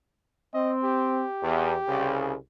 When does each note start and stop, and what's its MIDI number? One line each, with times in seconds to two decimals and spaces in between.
0.54 1.23 60
0.54 0.72 75
0.84 2.34 67
1.42 1.73 40
1.88 2.34 36
1.88 2.34 49